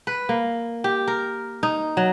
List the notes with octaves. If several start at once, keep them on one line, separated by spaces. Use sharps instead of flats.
B4
A#3
G4
A#4
D#4
F#3